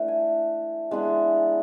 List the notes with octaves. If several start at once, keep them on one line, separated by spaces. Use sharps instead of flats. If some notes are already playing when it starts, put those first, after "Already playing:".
Already playing: E3 A3 D4
G#5
E3 G#3 B3 D4